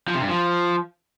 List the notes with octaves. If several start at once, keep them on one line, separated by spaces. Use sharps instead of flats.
F3
C3
G2
F3